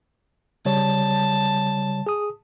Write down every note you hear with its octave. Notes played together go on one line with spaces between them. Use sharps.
C#3 G3 C#5 A5
G#4 D#6